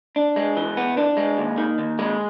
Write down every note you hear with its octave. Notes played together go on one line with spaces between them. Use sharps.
D4
G#3
E3
B3
D4
G#3
D#2
D#3
D#2
G#3